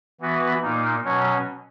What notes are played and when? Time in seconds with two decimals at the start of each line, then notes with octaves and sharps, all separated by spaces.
0.21 E3 B3 F#4 B4
0.62 A#2 A#3 D#4
1.05 B2 F#3 C#4